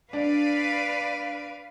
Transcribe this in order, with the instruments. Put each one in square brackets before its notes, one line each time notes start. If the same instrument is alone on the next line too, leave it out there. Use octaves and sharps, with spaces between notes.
[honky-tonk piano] D4 [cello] B4 D5 [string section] F5